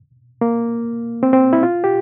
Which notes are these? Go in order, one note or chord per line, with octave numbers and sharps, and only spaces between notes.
A#3
C4
C4
E4
F4
G4